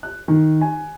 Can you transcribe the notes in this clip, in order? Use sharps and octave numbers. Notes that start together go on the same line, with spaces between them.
F#6
D#3
G#5